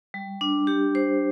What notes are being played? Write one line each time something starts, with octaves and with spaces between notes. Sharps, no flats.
G3
D4
G4
C5